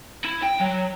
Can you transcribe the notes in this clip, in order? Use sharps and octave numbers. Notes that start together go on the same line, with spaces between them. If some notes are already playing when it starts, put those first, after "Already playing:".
E4
G5
F#3